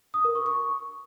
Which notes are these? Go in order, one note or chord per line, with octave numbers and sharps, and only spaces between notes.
D#6
A#4
C#6
C#6